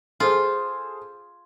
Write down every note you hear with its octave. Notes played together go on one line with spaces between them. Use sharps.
F4 G#4 A4 C5